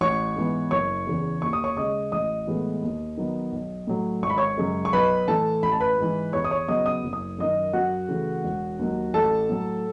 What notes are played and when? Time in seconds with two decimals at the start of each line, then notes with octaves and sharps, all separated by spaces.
0.01 A1 C#5 C#6
0.36 G#2 E3 B3
0.71 F#1 C#5 C#6
1.07 E2 C#3 E3
1.42 D#2 C#6
1.53 D#6
1.64 C#5 C#6
1.77 C#3 G#3 D#5 D#6
2.12 A1 D#5 D#6
2.47 A2 E3 G#3 B3
2.82 D#2
3.17 D#3 F#3 B3
3.52 B1
3.87 A2 F#3
4.23 G#1 C#6
4.30 B5
4.38 C#5 C#6
4.58 F#2 C#3 G#3
4.85 C#6
4.93 B1 B4 B5
5.28 A2 E3 A3 A4 A5
5.63 A1 B5
5.72 A5
5.80 B4 B5
5.98 G#2 E3
6.33 E2 C#5 C#6
6.44 D#6
6.51 C#5 C#6
6.68 C#3 F#3 B3 D#5 D#6
6.86 D#6
7.04 F#1
7.13 D#6
7.39 F#2 D#3 D#5 D#6
7.73 F#2 F#4 F#5
8.09 C#3 E3 A3
8.44 E1
8.79 D#2 D#3 F#3
9.14 A1 A4 A5
9.49 A2 F#3 A3